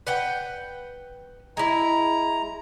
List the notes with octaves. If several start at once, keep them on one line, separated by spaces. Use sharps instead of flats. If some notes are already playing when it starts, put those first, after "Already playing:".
B4 F#5 G5
G#3 E4 A#5